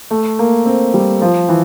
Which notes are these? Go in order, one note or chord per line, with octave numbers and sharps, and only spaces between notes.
A3
A#3
C4
G3
F3
E3